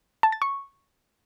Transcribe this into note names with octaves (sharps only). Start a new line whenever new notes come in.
A5
A6
C#6